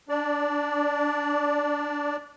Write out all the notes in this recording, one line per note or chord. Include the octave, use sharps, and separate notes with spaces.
D4 D5